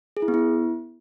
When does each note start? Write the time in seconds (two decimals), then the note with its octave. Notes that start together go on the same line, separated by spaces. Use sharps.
0.17 G#4
0.22 E4
0.28 B3
0.34 E4